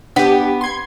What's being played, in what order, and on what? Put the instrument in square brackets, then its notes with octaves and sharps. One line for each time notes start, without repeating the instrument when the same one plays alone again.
[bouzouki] B3 [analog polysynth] D4 G4
[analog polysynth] C6 G#6